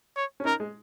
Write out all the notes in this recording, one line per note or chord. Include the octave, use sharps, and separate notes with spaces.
C#5
C#4
D#4 A#4
G#3